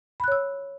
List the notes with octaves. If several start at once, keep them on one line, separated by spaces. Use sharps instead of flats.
C#5 B5 E6 F#6